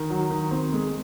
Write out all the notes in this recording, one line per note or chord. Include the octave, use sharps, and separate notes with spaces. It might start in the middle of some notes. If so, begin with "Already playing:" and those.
Already playing: D#3
F#3
D#3
C4
G#3